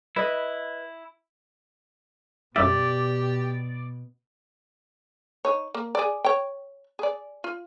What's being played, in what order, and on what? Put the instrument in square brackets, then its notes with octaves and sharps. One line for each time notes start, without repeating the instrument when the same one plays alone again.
[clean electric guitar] E4 [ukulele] B4 D#5
[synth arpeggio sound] F#2 G3 E4 [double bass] B2 [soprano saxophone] G4 [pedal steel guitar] D5
[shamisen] D#4 C#5
A#3
G#4 D5
C#5 G5
G#4 D5
F4